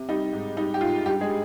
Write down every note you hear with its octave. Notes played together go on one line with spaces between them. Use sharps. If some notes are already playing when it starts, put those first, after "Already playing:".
Already playing: C3
G3 D#4
G#2
G3 D#4
G4
G#2 F4
G2 G3 G4
G#3 G#4
G3